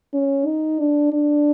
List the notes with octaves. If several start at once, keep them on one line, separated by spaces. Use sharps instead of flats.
C#4
D#4
D4
D4